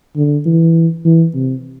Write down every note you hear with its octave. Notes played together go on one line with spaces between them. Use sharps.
D3
E3
E3
C3